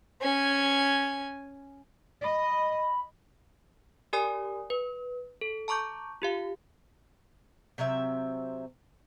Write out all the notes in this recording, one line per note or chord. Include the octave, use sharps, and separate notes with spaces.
C#4 G#5
D#5 B5
G4 A#4 D5 G#5 D#6
B4
A4
A5 A#5 C#6 D6 G6
F4 G4 F5
C3 F#3 C4 E5